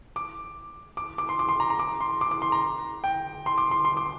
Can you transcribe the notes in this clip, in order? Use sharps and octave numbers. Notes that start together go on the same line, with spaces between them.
D6
D6
D6
C6
D6
C6
A#5
A#5
D6
C6
D6
D6
C6
A#5
G5
C6
D6
C6
C6
D6